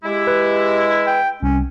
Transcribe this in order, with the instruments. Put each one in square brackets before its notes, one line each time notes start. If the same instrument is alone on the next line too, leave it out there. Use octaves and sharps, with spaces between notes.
[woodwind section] G#3 E4 [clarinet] G4
[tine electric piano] B4
[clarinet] G5
[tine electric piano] C2 [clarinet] C#4